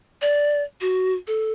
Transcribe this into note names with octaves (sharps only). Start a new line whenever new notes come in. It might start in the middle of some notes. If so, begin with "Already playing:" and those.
D5
F#4
A4